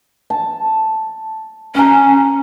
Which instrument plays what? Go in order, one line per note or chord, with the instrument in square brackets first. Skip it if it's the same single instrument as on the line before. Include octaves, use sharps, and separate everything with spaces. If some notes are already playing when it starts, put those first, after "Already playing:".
[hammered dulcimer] A5
[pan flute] C#4 [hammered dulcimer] A#5 C#6